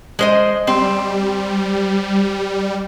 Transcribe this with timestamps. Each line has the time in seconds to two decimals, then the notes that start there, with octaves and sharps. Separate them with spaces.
0.19 G#3 C5 D#5
0.67 G3 C4